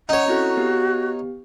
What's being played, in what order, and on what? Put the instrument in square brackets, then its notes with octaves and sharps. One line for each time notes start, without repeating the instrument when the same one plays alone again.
[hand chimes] C#4 [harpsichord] D#4 C#5 [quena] F#5
[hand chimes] C4 E4 A4 [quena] F#4
[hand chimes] B3 G4